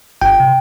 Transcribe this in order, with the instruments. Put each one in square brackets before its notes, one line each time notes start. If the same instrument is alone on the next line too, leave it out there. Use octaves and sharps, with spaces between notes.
[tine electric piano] G1 G5
C3